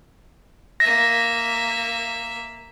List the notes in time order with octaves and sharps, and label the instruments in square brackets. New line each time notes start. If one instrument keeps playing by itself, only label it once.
[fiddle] A#3 E5 [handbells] A#6